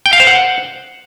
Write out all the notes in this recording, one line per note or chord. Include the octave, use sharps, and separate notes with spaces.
G5
F5
C5
F#5